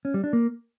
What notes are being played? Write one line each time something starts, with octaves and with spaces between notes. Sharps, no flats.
C#4
G3
D4
A#3